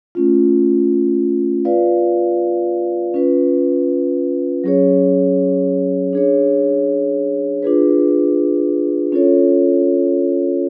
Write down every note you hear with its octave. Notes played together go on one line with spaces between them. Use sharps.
A3 C#4 F4
F4 B4 D5 F5
C#4 F4 B4
F#3 C#4 G#4 C#5
D4 G#4 C#5
D4 F4 G#4 B4
C#4 F4 A4 C#5